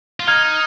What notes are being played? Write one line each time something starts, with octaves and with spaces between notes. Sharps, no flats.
F4
D#4 F6 G#6